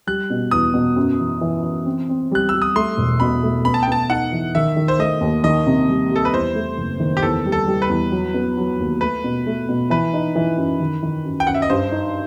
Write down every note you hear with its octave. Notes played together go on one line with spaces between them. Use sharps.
G3 F#6
B2
E2 D#6
B2
F#2
E3
E3
E3
C4
C4
G3 F#6
G3 E6
D#6
A3 C6
E1
B2 B5
A3
B3 B5
A5
G5
B3 A5
D#4 F#5
E3
D#3 E5
D#3
C5
A3 D#5
D#2
D#3 D#5
C3
G3
G3
A4
B4
E2 C5
A3
F#1
D#3
G4
E2 A4
G3
A4
G3
B4
E2
F#3
B3
F#3
D#2
A3 B4
B2
A3
B2
E3 B4
D#4
E3
F#2
D#3
D#3
F#2
G5
F#2 F#5
E5
D#5
G2 C5
D#4